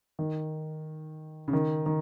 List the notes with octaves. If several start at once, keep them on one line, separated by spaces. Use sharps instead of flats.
D#3
C#3
D#3
D#3